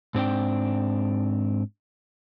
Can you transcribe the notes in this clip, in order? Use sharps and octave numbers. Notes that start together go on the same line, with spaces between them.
G#2 C4 D4 G5